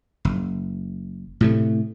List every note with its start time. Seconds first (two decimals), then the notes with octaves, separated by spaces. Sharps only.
0.25 F#1
1.41 A2 C3 A3